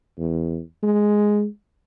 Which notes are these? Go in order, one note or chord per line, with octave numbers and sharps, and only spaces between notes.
E2
G#3